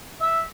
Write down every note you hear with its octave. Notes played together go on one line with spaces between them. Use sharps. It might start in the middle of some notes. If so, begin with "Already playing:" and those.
E5